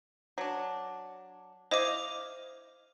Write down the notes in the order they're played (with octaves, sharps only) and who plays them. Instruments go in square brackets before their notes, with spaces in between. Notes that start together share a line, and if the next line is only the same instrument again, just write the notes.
[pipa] F#3 D4
[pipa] E4 D#5 F5 [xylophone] C5 D6